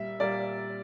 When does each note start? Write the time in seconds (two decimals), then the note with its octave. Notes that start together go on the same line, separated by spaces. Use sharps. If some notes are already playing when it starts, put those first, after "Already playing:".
Already playing: A#2 G3 A#3 E5
0.20 A#2 G3 A#3 D5